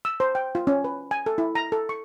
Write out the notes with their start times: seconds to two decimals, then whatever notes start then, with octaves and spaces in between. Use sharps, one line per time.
0.05 E6
0.20 C5
0.35 G5
0.55 F4
0.67 C#4
0.84 B4
1.11 G#5
1.26 A4
1.38 E4
1.55 A#5
1.72 A4
1.89 C#6